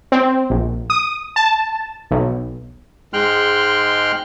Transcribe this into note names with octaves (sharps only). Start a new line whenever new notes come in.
C4
A#1
D#6
A5
B1
G#2 G#3 G5 C6 F6 F#6